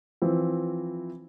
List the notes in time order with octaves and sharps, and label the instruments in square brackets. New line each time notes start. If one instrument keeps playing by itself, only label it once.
[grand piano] E3 F3 C4